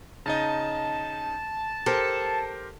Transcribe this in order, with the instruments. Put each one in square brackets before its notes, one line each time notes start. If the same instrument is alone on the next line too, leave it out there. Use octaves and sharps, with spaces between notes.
[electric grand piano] C#3 D#4 D#5 [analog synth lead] A5
[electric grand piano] G4 A#4 C5 [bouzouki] A4